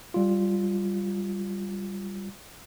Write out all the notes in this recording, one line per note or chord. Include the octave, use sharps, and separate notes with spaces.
G3 F4